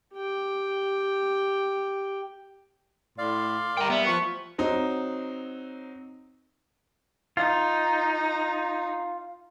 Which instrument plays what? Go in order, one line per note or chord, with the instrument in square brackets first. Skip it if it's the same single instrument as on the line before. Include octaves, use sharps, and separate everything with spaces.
[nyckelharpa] G4 G5
[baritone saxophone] A2 [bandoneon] D5 F5 [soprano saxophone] C6
[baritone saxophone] G3 [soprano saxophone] A#4 [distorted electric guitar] G5 A#5
[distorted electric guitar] B3 [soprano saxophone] E5
[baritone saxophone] F3 [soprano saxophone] C#6
[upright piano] F#3 C4 D#4
[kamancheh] D#4 [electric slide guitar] F4